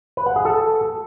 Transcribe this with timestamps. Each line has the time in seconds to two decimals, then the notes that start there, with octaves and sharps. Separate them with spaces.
0.17 B4
0.26 F#5
0.36 G#4
0.45 A4